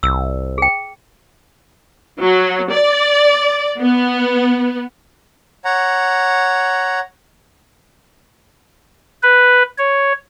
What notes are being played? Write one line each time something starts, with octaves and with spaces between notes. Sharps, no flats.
C2 E6
G#4 G5
F#3
D5
B3
C#5 F#5 A#5
B4
C#5